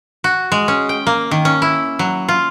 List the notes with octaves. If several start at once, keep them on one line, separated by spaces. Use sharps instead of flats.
F#4
G#3
C#4
G5
A#3
D#3
C#4
E4
F#3
F4